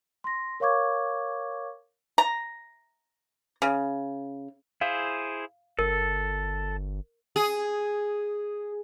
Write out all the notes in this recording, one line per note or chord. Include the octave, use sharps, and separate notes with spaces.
C6 A#6
A#4 C#5 F5 C#6 D6 G#6
A#5
C#3
E4 G#4 C5 F5
G1 A4 A#4
G#4